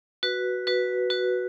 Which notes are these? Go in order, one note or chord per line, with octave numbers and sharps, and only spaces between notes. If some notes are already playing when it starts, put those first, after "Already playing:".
F#4 B4
F#4 B4
F#4 B4